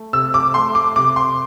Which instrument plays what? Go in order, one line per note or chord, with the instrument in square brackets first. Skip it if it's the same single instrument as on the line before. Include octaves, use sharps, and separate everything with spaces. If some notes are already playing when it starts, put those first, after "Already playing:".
Already playing: [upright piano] A3
C3 E6
D6
A3 C6
D6
C3 D6
C6